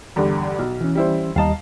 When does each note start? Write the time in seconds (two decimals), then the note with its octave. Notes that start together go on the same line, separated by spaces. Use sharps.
0.16 E2 G2 D3
0.59 B1
0.81 E3 C#4
0.95 G3 E4 C5
1.36 D#2 G3 D#5 F5 A5 A#5